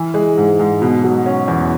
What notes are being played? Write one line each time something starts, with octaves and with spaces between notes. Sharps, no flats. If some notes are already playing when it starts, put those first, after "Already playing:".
Already playing: E3
G#3
G#2
G#2
B2
F#3
C#4
E2